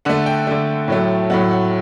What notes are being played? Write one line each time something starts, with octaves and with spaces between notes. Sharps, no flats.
D3 A3 F#5
G5
D3 A3
A2 F#3 A3
A2 F#3 A3 F#5
F#5